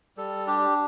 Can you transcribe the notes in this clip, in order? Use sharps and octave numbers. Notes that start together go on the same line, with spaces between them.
G3 A4
D4 G4